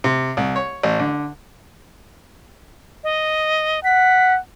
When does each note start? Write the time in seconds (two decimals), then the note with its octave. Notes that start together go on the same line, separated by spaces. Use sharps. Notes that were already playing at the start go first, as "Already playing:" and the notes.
0.04 C3
0.37 C2
0.56 C#5
0.83 A1
0.99 D3
3.04 D#5
3.84 F#5 B6